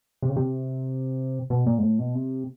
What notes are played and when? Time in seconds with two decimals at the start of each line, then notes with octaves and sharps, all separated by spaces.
0.22 C3
0.29 C#3
0.36 C3
1.50 B2
1.66 A#2
1.78 G#2
1.83 A2
1.99 B2
2.15 C3